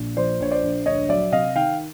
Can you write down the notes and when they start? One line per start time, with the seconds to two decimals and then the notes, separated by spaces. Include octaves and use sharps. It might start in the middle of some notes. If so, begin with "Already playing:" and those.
Already playing: A#1 A#2
0.17 F3 C5 D5
0.40 A#1 C#5
0.51 C5 D5
0.63 A#1
0.86 D2 C#5 D#5
1.09 F#3 D5 E5
1.32 C3 D#5 F5
1.55 D#3 F5 G5